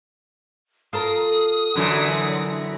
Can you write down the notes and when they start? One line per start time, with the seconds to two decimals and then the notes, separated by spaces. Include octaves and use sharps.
0.93 F4 A4 A#4 D#6
1.76 F#2 D3 E3 F#3